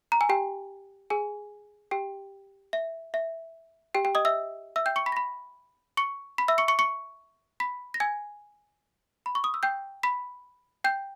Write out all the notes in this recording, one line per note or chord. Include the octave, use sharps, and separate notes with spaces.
A#5
G#5
G4 G5
G#4 G#5
G4 G5
E5
E5
G4 G5
G4 G5
D#5 D#6
E5 E6
E5 E6
G5 G6
C#6 C#7
B5 B6
A#6
B5 B6
C#6 C#7
B5 B6
E5 E6
C#6 C#7
C#6 C#7
C#6 C#7
B5 B6
A#6
G#5 G#6
B5
C#6
D#6
E6
G5 G6
B5 B6
G5 G6